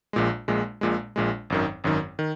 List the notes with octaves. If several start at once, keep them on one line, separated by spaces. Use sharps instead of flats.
A#1 A#2 G#3
A#1 A#2 G#3
A#1 A#2 G#3
A#1 A#2 G#3
G#1 F#2 D#3
G#1 F#2 D#3
D#3